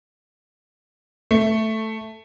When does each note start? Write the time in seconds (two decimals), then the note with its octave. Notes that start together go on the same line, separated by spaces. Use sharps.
1.31 A3